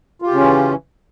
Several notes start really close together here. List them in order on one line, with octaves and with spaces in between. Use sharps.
F4 G4 C#3 C#4 E3